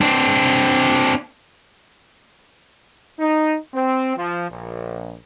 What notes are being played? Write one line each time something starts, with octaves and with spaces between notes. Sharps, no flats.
C4 D4
D#4
C4
F3
A#1